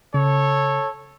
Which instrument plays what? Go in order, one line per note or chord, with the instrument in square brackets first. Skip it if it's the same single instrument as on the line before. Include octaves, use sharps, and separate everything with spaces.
[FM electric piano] C#3 [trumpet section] A4 C#5